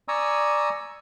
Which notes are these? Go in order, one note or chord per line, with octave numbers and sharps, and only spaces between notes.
D5 G#5 A#5 C#6 D#6 E6